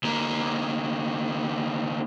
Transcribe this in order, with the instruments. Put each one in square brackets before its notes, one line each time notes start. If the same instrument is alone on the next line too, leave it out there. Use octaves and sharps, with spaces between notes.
[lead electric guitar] D2 A#3